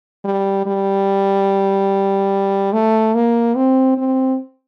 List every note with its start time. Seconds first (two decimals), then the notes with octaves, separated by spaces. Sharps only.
0.25 G3
0.66 G3
2.73 A3
3.14 A#3
3.56 C4
3.98 C4